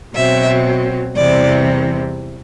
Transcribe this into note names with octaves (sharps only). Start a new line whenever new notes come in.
B2 F#3 C4 E5
E2 C3 E3 G3 C4 D5